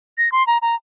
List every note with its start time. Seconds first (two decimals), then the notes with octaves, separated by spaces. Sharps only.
0.18 A#6
0.32 C6
0.47 A#5
0.62 A#5